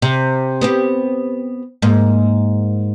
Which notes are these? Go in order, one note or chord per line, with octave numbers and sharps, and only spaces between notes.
C3
B3 C4 G4
G#2 A#3